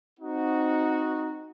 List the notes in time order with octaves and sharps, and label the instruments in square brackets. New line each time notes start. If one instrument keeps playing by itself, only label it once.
[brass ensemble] C4 D#4 F#4